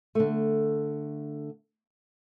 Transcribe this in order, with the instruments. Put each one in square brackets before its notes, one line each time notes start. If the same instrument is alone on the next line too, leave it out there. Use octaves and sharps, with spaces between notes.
[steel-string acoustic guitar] D3 A3